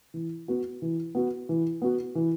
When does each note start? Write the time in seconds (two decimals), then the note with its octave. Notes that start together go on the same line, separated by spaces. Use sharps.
0.14 E3
0.48 B3 F#4
0.82 E3
1.15 B3 F#4
1.49 E3
1.82 B3 F#4
2.15 E3